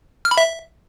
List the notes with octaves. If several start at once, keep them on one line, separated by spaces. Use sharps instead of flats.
F6
B5
E5